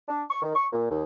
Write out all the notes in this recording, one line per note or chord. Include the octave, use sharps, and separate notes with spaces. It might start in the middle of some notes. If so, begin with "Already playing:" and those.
D4
C#6
D#3
C#6
A#2
D#2